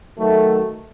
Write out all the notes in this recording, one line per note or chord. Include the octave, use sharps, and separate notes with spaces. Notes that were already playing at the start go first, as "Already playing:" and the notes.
D#3 F#3 A3